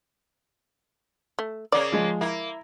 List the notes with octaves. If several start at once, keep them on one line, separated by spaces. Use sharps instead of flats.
A3
C#3 A#3 C#4 D5
F3 G#3
A#3 E4